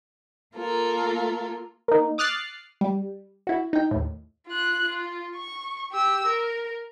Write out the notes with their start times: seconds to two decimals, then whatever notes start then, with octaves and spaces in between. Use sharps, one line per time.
0.55 A#3 F4 A4 A#4
1.88 A#3 D#4
2.18 D6 D#6 F6 F#6 A6 C7
2.81 G3
3.47 E4 F#4
3.73 D#4 G5
3.91 D#2 A2
4.47 F4 F#6
4.85 F4
5.36 C#6
5.92 G4 E6
6.27 A#4